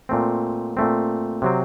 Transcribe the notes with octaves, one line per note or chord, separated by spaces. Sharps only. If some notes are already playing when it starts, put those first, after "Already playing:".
A#2 A3 C4
A#2 A3 C4
C3 F#3 C4